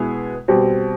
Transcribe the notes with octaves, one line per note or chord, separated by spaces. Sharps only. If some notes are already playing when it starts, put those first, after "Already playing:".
Already playing: B2 G#3 B3 E4 G#4
B2 G3 C4